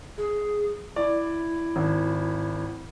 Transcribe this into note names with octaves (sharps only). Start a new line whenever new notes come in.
G#4
E4 D5
G#1